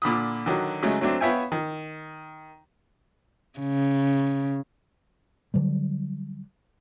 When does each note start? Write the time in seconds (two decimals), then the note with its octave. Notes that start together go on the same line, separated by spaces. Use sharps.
0.02 A#2 D3 B5 D#6
0.46 D3 D#3 F#3
0.83 C#3 F#3 G#3 A3
1.01 F#3 A3 C4 D4
1.21 B3 C#5 E5 F5 G5 G#5
1.52 D#3
3.59 C#3
5.54 D3 F#3 G3